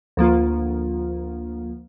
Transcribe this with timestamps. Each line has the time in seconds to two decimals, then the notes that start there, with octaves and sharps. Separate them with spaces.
0.17 D2 F3 A#3 F4